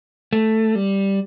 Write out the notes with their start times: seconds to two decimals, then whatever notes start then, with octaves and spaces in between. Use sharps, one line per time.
0.33 A3
0.75 G3